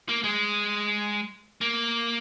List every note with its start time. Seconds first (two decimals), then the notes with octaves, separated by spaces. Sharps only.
0.09 A#3
0.24 G#3
1.61 A#3